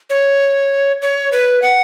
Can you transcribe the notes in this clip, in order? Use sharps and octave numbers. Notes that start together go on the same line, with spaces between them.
C#5
C#5
B4
F#5